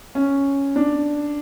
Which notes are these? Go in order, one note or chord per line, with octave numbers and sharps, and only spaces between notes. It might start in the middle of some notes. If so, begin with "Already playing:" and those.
C#4
D4